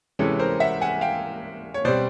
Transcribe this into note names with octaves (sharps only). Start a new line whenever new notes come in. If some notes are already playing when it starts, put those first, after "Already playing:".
C3 E3 G#3 C#4 A4
A#4 C5
E5 F#5
F#5 G#5
F5 G5
C#5
B2 G3 C4 C5 D5